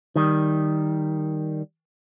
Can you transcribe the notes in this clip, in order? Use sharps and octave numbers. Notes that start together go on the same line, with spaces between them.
D#3 G3